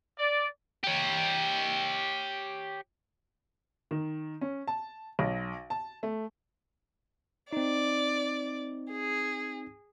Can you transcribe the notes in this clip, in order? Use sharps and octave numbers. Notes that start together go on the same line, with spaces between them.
D5
G4 C#5
D#3
C#4
A5
B1
A5
A3
C4 D#4 D5
G#4